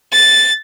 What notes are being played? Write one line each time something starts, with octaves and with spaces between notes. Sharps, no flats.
A6